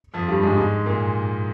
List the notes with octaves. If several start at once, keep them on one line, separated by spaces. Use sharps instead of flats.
F2 F3
G2 G3
G#2 G#3
G#2 G#3
A#2 A#3